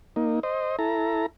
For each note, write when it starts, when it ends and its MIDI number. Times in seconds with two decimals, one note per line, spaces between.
0.16 0.40 58
0.16 0.40 63
0.43 0.76 72
0.43 0.76 75
0.79 1.26 64
0.79 1.26 69
0.79 1.26 82